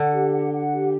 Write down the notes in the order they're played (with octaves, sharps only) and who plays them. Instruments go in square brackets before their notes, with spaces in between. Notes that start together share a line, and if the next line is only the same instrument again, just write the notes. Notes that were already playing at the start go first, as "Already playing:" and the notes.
Already playing: [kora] D3 [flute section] F#5
[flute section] G4
F#5
F#5
G4